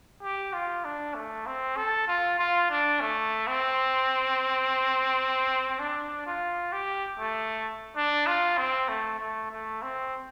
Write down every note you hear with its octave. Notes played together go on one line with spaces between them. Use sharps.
G4
F4
D4
A3
C4
A4
F4
F4
D4
A3
C4
D4
F4
G4
A3
D4
F4
C4
A3
A3
A3
C4